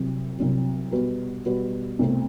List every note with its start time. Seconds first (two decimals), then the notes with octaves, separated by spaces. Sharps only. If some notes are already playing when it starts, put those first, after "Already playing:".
Already playing: C2 C3 F#3
0.38 C2 C3 F#3
0.91 B2 G3 B3 F#4 B4
1.46 B2 G3 B3 F#4 B4
1.99 C2 B2 A3 C4